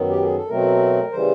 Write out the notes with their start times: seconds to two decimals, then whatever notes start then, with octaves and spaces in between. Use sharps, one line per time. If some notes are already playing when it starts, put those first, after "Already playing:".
Already playing: F#2 D#3 F#3 B3
0.10 G4
0.22 G#4
0.36 A4
0.49 B2 F#3 A3 C4 A#4
1.12 C#3 E3 G3 C5